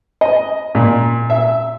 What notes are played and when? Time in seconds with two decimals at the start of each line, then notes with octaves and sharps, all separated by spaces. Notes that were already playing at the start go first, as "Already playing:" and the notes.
0.21 D#5
0.75 A#2
1.30 E5